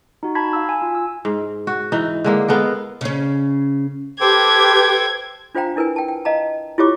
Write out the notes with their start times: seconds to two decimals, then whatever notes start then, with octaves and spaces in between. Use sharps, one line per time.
0.23 D#4 F#4
0.35 A5 B5 G#6 B6
0.53 F5 E6
0.69 G#5
0.82 F4
0.95 E6
1.25 G#2
1.67 F#4
1.92 E3 D#4
2.24 D3 G#3 A#3
2.48 G#3 B3 A4 A#4
3.01 C#3 C#4
4.20 G4 A4 B4 C5 G5 D6 G#6
5.55 D4 F4 C5 F5 G5 A#5
5.76 D4 E4 A#4 B4 G#5
5.96 G5 A5
6.08 G5
6.25 D#5 F5 A5 A#5
6.78 E4 F4 G4 C#5 D6